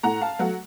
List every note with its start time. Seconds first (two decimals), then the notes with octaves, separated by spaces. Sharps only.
0.03 A2 F#5 A#5
0.21 F5 A5
0.39 F#3 A3 F#5